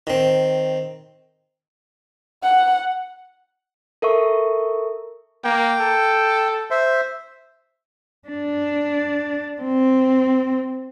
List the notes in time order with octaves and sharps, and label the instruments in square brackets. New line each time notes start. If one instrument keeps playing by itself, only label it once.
[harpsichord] D#3 C4
[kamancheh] F#5
[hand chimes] A4 A#4 E5 C#6
[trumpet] A#3 [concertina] G5
[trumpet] A4
[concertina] C5 E5
[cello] D4
C4